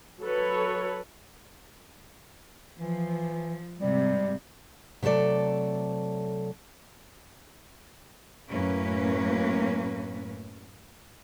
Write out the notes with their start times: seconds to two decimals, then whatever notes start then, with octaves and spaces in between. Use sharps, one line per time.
0.21 F#3 A4 B4 C#5
2.78 E3 F3
3.79 G#2 C3 G3
5.03 C3 F#3 A3 A4 D5
8.50 F#2 A2 A#3 C#4 B4